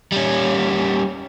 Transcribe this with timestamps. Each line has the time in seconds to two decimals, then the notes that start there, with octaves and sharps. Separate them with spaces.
0.12 G3 C#4